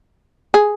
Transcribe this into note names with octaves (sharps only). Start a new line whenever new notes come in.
G#4